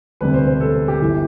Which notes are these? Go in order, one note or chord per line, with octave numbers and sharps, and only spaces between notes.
E1 D2 C3 G3 C4 B4
C5
C5
A4
G4
G1 E3